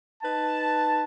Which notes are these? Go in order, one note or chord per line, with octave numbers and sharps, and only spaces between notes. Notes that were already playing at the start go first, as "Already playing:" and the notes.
D#4 B4 A5